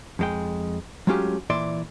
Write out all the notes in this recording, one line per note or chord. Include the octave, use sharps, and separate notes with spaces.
F2 G#3 G5
F#3 G#3 A3 C#4 F4 G4
A#2 E3 D5 E5 C6